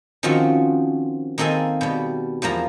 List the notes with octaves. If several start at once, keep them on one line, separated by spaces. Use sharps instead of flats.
D#3 F3 C4 C#4 F4 F#4
D#3 A#3 C4 A4 G#5
B2 G3
E2 F3 A#3 A#5